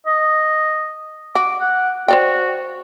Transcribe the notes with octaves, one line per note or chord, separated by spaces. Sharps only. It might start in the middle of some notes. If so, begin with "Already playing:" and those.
D#5
F#4 D6
F#5
F#4 C5 D5 G5